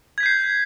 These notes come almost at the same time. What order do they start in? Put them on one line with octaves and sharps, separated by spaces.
G#6 B6 G6 C7